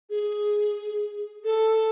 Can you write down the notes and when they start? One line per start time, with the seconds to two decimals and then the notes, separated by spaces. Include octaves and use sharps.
0.10 G#4
1.44 A4